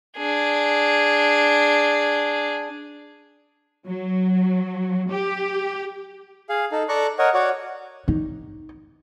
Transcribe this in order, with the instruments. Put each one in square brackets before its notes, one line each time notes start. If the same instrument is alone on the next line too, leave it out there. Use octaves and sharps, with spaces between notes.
[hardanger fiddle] D4 G#4
[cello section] F#3
G4
[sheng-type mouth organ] G#4 F5
D#4 A4
A4 D5 A#5 C#6 F#6
A#4 C#5 D#5 F#5
F#4 C#5 D5 F#5
[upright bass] D#4